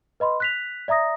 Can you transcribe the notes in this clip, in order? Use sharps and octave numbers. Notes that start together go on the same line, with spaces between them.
B4 D#5 B5 C6
F#6 B6 F7
D5 E5 A#5 D#6 A#6